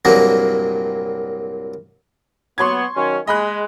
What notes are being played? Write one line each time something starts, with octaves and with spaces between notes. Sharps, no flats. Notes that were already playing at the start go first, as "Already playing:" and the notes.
C2 G2 A#2 F#3 G#3 A#3
F#3 B3 C6 C#6 G#6
D#3 F#3 C#4
G#3 D#5 B5 F#6